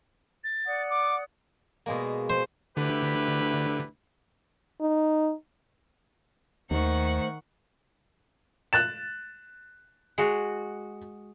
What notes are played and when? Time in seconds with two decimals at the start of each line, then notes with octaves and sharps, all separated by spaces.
0.43 A6
0.66 D5 F#5 D#6
0.90 D6
1.86 B2 G#3 A#3
2.30 C5
2.77 D2 D3 E4 G4 B4
4.81 D#4
6.71 D#2 D#3 A3 C5 F#5 C#6
8.73 F#6 A6 E7
10.18 G#3 F#4